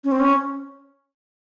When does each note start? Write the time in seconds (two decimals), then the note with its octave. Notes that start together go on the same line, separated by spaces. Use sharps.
0.04 C#4
0.12 C4
0.20 C#4